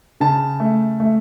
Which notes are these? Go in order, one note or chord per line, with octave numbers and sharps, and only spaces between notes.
C#3 A5
A3
A3